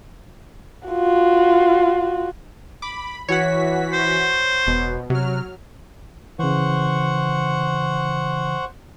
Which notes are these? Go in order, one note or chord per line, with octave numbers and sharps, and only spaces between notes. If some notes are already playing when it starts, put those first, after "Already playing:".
F4 F#4
B5 D6
E3 F#4 C#5 F#5 B6
C5
E1 B2
C3 F#3 F6
C#3 E3 C5 F#5 C#6